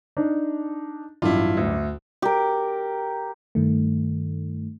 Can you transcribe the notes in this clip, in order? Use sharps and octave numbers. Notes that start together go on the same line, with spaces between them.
D4 D#4
A1 G2 F#3 E4 F4
D2
G4 A#4
G2 D#3 A3